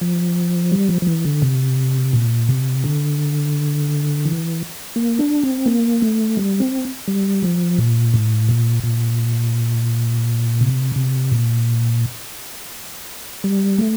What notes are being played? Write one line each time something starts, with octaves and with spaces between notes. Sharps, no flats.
F3
G3
F3
F3
E3
D3
C3
A#2
C3
D3
E3
A#3
D4
C4
A#3
A3
G3
C4
G3
F3
A#2
A2
A#2
A#2
C3
C3
A#2
G3
A3